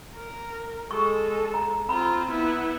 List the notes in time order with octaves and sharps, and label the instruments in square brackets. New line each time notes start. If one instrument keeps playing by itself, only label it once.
[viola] A#4
[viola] G#3 A4 [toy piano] C#6
[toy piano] A#5
[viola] C4 F4 [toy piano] A#5 B5
[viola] B3 E4